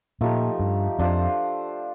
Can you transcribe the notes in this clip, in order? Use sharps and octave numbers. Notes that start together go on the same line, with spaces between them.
A#2 F3 A3 D#4 G4
G2
F2 D4 F4 C5